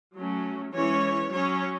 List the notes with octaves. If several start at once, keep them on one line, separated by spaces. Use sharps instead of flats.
F#3 A3 C#4
E3 G#3 C#4 C#5
F#3 C#4 C#5